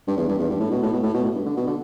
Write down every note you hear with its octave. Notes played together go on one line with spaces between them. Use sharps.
G2
E2
G2
E2
G2
A2
B2
A2
B2
A2
B2
A2
G2
D3
B2
D3